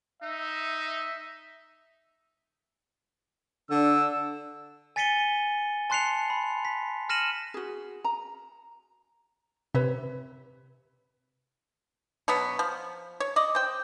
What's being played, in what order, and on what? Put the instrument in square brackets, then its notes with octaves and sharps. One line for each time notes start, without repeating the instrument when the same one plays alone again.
[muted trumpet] D#4 [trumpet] E5
[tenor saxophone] D3 [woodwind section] D4 [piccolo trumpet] E6
[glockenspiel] G#5 A6 B6 C#7 D#7 G7
A5 C6 F#6 C7 C#7 F7
B5
B6
F6 A#6 C#7 D#7 E7 F#7
[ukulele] F#4 G#4
A#5
[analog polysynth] C3 [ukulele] B4 C#5 E5
[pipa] B2 F#3 B3
F3
C#5
D5 D#5
C5 G5